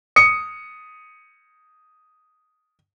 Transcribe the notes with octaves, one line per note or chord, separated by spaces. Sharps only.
D#6 C#7